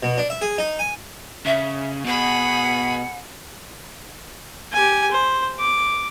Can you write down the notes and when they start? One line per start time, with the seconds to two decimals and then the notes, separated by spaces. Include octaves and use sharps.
0.03 B2
0.18 D4
0.30 E5
0.42 G#4
0.58 D#4
0.79 G#5
1.46 C#3 E5
2.05 B2 G#4 F#5 B5
4.73 G4 G#5
5.11 C5
5.59 D6